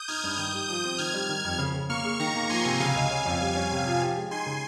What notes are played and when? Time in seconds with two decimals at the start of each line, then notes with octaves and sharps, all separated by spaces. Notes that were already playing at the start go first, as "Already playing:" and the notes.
Already playing: D#6 G6
0.08 D#4 F6 G#6
0.24 G2
0.38 D#3 D#6 G6
0.53 G3
0.68 F3 D#6 G6
0.84 C4
0.98 D#3 F6 G#6
1.14 G3
1.29 D#3
1.44 F2
1.59 C#3
1.74 C#3
1.89 A#3 C#6 F6
2.04 G#4
2.20 D#3 A#5 C#6
2.35 A#3
2.49 F3 G#5 C6
2.65 C3
2.80 C#3 F5 G#5
2.95 C#2
3.10 C#4
3.25 F2
3.41 G3
3.56 C#4
3.71 C3
3.86 F3
4.02 G4
4.16 G#3
4.31 D#4 G#5 C6
4.46 C#3